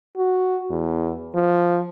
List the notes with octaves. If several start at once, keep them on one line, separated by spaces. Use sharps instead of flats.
F#4
E2
F3